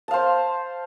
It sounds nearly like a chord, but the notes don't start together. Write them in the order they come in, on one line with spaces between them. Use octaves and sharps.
A5 F5 C5